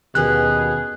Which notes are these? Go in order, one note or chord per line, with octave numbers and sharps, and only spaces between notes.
D#2 B2 D#3 C#4 G#4 F#6